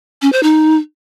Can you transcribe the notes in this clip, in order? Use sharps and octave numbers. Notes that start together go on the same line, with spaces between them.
C#4
C5
D#4